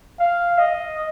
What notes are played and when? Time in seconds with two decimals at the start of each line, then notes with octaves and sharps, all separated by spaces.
0.20 F5
0.58 D#5